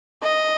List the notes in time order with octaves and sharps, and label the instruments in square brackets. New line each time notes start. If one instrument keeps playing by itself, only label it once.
[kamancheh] D#5